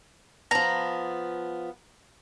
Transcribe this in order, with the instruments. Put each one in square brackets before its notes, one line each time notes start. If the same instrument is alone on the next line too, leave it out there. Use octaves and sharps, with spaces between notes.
[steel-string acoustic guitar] F3 B3 [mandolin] A#5